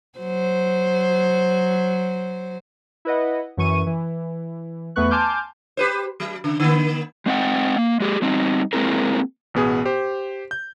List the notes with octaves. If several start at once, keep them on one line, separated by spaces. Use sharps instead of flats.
F#3 C5
E4 B4 D#5 F#5
F#2 E3 C#6 D#7
E3
E2 A3 B3 B4 C#6 F#6
G#5 A5 C6 D6 F6 G6
G4 B4 C5
F#3
C#3
D3 A#3
G#3 C4 D#5 F#5 G5
A#3
G#3 G4 G#4
G3 C4 D#4
G#3 A#3 C4 E4 G#4 A#4
A1 B2 B3 G#4 D#6
G4 C5
G6